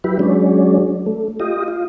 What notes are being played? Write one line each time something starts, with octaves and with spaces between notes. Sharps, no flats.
F#3 E4 G4 B4
F#3 G#3 C#4 D4
A3
F4 G4 D#5
F4